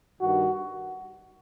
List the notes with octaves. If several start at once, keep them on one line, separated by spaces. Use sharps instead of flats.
G2 D#3 F#4